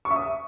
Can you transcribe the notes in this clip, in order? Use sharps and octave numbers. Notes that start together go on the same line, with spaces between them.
C#6
E5
D#6